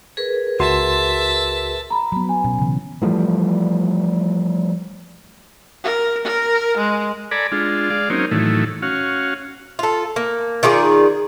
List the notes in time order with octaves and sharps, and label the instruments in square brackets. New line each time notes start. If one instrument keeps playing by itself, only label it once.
[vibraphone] G#4 A#4 B4
[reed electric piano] C#2 F#4 C6 [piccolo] E5 [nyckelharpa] A5
[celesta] A#5 B5
[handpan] F#3 B3
[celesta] G#5
[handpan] B2 C#4
C#3 E3
[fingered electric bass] E3 F3 G3 A3
[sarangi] A#4
A#4
G#3
[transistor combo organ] A4 D5 G#5 A#5 B5
G#3 D4 F4
G#3 D5 F5
F#3 A#3 C4 C#4 D#4
A2 D#3 E3 F#3 A3
C#4 F#4 F5
[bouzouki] F4 A4
A#3
D#3 F4 G#4 D5